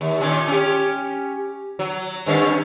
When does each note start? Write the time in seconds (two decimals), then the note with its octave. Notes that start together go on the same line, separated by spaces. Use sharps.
0.01 D#2
0.20 A#2 D#3 C#4
0.48 C#4 G4
1.79 F#3
2.26 G2 D#3 C#4